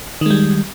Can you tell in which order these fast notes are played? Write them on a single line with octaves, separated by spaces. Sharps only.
D#3 G#3 G3